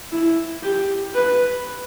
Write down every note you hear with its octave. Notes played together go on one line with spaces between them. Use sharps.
E4
G4
B4